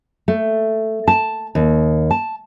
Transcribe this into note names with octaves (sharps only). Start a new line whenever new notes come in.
A3
A5
D#2
A5